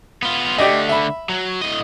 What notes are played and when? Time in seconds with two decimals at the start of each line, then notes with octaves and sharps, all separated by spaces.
0.23 B3 F4
0.58 D3 A3 G4 D5 D#5
0.89 E5 B5
1.29 F#3
1.62 A2 D#5